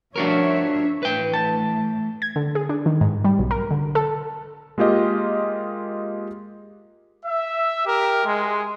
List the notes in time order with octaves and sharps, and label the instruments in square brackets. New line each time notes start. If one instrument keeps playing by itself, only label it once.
[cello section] F3 C#5 E5 [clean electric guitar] D4 F#4 A#4
[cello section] A2 E3 [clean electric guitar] B4 G5
[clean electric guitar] A5
[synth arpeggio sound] G#6
D3
G#4
D4
D#3
G#2
G3
B1
A#4
D3
A4
[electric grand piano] G#3 A#3 F4 G4 D#5
[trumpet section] E5
G4 A#4
G#3